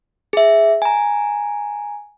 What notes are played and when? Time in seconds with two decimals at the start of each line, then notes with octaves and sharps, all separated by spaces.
0.33 G#4 E5
0.82 G#5 A#5